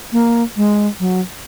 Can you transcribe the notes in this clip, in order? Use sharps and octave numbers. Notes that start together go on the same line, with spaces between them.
A#3
G#3
F#3